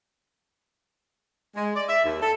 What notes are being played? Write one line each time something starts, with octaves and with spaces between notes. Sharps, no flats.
G#3
D5
E5
D#2
A4